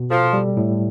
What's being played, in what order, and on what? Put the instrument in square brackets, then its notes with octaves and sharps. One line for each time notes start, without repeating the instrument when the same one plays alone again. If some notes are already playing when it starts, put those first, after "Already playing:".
Already playing: [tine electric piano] B2
[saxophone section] F3 [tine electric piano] A4
[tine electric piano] G3
A2